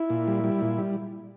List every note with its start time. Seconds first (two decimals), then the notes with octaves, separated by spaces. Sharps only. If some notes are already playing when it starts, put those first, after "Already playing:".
Already playing: E4
0.10 A#2
0.27 G3
0.44 G3
0.62 A#2
0.79 G3